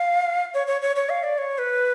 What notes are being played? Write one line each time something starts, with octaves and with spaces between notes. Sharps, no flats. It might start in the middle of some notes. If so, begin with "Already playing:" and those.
Already playing: F5
C#5
C#5
C#5
C#5
F5
D5
C#5
B4